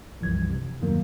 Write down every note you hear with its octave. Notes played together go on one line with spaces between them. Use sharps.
C2 F#2 E3 F3 G#6
C3
E2 G2 D#3 F#3 A#3